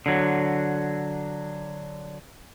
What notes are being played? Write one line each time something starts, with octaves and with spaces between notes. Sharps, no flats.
D3 F#3